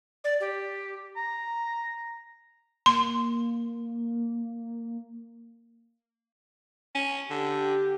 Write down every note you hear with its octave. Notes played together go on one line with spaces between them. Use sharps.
D5
G4
A#5
A#3 C6
C#4
D3 G4